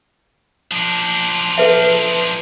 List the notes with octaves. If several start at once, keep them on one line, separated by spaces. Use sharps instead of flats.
F3 D4
A4 B4 E5